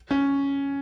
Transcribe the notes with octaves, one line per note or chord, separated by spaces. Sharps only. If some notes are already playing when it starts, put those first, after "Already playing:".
C#4